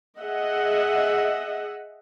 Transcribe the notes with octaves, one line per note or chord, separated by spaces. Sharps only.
G#4 D#5 E5 F#5